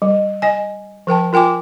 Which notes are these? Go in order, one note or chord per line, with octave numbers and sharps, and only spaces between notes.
G3
D#5 G#5
F3 A#4 G5 A5
F4 A#4 G5 G#5 D6